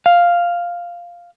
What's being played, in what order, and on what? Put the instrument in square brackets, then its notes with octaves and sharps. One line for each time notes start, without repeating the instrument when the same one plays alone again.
[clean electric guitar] F5